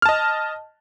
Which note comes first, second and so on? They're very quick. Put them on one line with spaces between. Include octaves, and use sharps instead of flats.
F6 A5 D#5